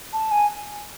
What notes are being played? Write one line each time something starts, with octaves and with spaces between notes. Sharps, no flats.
A5
G#5